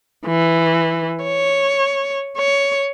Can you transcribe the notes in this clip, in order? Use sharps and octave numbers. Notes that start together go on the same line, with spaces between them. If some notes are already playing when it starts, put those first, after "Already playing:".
E3
C#5
C#5